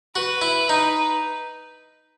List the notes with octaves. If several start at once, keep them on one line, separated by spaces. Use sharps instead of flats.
F#4 B4
E4
D#4